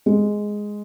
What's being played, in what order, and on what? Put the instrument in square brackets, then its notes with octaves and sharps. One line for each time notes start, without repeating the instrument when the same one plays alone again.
[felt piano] G#3